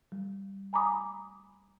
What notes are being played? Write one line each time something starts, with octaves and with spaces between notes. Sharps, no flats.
G3
G#5 A#5 B5 D6 D#6